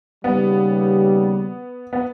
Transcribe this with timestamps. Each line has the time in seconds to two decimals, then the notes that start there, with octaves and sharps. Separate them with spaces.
0.24 D#2 C#3 G3 B3
1.93 B3